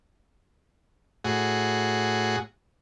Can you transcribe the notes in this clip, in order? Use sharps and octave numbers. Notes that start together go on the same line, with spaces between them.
A2 F#4 G#4